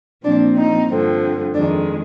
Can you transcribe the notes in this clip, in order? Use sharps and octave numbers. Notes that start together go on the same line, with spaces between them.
A#2 F3 C4 D4
D#4
G2 D3 F3 C4
F2 D#3 G#3 D4